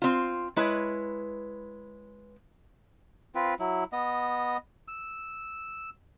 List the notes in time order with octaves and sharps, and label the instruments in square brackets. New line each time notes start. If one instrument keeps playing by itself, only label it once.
[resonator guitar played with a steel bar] C4 F4
G#3 E4 B4 C#5
[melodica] C4 F4 B4
F#3 E4
B3 D#5
E6